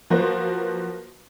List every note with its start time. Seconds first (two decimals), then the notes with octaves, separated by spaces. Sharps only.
0.10 F3 F#3 A#3 F#4 B4 C5